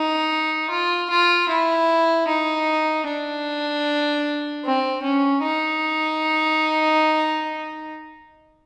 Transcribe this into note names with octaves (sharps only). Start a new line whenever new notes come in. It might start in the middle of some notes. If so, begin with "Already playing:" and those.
Already playing: D#4
F4
F4
E4
D#4
D4
C4
C#4
D#4